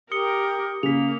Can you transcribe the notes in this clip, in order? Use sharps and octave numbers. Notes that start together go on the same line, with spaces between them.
G4 A#4 D#6 C#7 G7
C#3 A#3 B6 F7